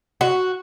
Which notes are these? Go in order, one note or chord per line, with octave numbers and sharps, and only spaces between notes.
F#4